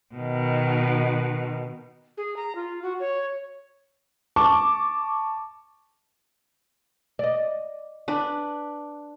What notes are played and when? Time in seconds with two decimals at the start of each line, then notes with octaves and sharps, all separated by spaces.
0.15 B2 D#3
2.17 G#4
2.37 A#5
2.55 F4
2.83 F#4
3.00 C#5
4.36 A5 C#6 D6
7.19 D5 D#5
8.08 D4 B4